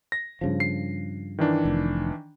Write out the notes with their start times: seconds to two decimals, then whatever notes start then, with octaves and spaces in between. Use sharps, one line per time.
0.12 A#6
0.41 G2 C#3 F3
0.60 C7
1.39 D#3 E3 D4
1.65 F1